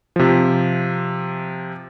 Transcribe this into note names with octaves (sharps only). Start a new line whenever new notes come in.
C3 F3